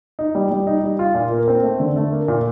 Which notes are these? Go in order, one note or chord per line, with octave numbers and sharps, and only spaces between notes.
D#4
G3
G3
D#4
G3
F4
A#2
A#3
C4
A3
D3
A3
A#3
A#2